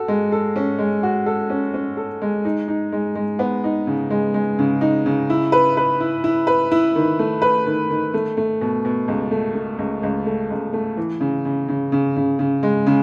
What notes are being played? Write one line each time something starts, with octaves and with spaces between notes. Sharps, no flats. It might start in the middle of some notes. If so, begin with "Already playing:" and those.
Already playing: F#4 A4
G#3
A4
C#4
G#3
F#4
A4
C#4
C#4
A4
G#3
D#4
D#4
G#3
G#3
B3
D#4
C#3
G#3
G#3
C#3
D#4
C#3
E4
B4
B4
E4
E4
B4
E4
D#3
A3
B4
D#3
D#3
A3
A3
B2
B2
C#2
A3
A3
C#2
C#2
A3
C#2
A3
E3
C#3
C#3
C#3
C#3
C#3
C#3
G#3
C#3